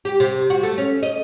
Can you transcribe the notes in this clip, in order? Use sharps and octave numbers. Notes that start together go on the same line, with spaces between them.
G4
C3
F#4
A3
C#4
D#5